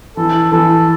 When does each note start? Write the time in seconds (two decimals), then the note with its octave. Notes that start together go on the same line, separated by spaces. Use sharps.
0.17 E3 A4
0.52 E3 A4